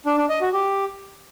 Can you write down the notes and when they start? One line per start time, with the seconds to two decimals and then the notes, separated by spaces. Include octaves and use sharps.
0.06 D4
0.18 D4
0.29 D#5
0.41 F#4
0.53 G4